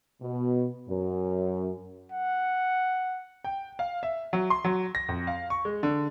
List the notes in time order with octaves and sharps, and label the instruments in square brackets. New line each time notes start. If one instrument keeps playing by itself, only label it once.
[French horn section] B2
F#2
[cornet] F#5
[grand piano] G5
F5
E5
F#3
C6
F#3
A#6
F2
F5
C#6
G#3
D3